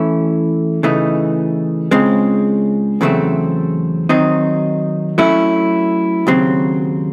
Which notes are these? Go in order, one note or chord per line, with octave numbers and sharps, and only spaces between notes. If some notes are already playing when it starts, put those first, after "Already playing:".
Already playing: E3 A3 C#4 E4
C#3 E3 A3 D#4
C#2 C#3 G#3 C4
E2 C#3 F#3 A3 C4
D#3 F#3 C4 D#4
F#3 A3 C#4 E4
D#2 C#3 F#3 C4